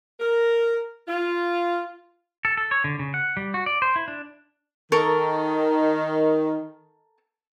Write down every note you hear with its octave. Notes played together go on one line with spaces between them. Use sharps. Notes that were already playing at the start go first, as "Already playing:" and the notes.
A#4
F4
A4
A4
C#5
D3
C#3
F#5
G3
F#4
D5
C5
E4
D4
D#3 A4 A#4 C#6